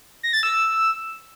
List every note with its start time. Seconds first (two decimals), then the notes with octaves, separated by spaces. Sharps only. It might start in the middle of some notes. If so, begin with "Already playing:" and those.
0.23 A#6
0.33 A6
0.43 E6